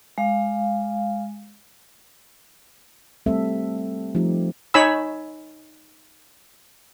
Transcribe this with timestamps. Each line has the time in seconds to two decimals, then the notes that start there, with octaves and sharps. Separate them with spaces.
0.18 G#3 F5
3.26 G3 A3 C4 A4 E5
4.15 F3 A3 D#4 G4
4.74 D#4 C#5 G#5 B5 E6